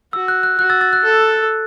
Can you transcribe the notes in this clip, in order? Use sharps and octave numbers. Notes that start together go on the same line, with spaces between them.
F#4 E6
F#6
F#6
F#4 F#6
E6 A6
E6 A6
F#6
A4